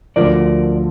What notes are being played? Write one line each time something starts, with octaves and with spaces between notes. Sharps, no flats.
D2 D3 F3 A#4 D5